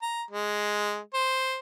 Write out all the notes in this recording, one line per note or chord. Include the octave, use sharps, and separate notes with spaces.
A#5
G#3
C5